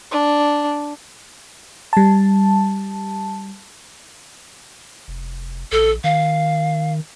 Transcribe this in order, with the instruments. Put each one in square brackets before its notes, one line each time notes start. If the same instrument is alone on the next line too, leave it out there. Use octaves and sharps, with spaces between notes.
[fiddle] D4
[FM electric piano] G3 A5
[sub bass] F1
[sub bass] A#1 [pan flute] A4
[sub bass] D#3 [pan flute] F5